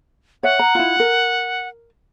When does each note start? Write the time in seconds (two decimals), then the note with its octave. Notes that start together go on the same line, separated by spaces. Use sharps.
0.43 C#5 E5 F#5
0.59 A#5
0.75 E4 F4
1.00 A#4